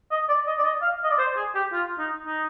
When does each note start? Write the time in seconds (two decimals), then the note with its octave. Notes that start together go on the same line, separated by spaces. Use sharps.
0.11 D#5
0.28 D5
0.47 D#5
0.58 D5
0.65 D#5
0.82 F5
1.04 D#5
1.10 D5
1.19 C5
1.36 G#4
1.55 G4
1.72 F4
1.98 D#4
2.25 D#4